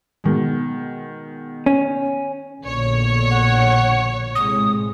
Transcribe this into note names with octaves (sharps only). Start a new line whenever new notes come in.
B2 D#3 G#3
C#4
A#1 B2 D3 C#5
F#5
A2 C3 G#3 D#6